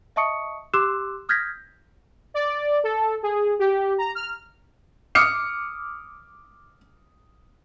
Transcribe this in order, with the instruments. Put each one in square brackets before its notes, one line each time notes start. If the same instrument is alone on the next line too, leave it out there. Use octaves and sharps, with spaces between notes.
[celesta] D#5 E5 A5 C#6 D#6 C#7
G4 C6 D6 E6 F#6 E7
D#6 F6 G6 G#6 A#6 B6
[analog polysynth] D5
A4
G#4
G4
A#5
F6
[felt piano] D6 D#6 F6 C#7